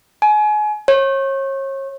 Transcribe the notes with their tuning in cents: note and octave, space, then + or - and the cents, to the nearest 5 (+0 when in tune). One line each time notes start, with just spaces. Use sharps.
G#5 +30
C#5 -35